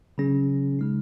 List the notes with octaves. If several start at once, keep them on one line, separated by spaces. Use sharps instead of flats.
C#3 F#3 C#4 G#4
C#3 G#3 D#4